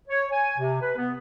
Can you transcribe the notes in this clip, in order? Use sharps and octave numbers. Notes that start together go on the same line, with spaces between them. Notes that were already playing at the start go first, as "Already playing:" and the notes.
C#5
G#5
C3
B4
B3